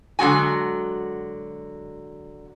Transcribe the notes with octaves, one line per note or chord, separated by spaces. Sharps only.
D3 F#3 G#3 F#4 G#5